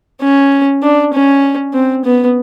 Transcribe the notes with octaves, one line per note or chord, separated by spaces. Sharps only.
C#4
D4
C#4
C4
B3